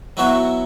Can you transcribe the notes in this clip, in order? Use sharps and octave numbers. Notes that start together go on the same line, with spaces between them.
F#3 B3 E4 F#4 C#5 E5